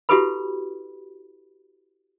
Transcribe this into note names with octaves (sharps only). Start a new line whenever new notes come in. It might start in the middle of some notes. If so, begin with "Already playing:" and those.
E4 F#4 G4 A4 B4 B5